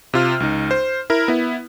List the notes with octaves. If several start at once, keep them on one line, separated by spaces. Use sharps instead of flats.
C3 F4 F6
C#2 D#4
C5
E4 A#4
B3 E4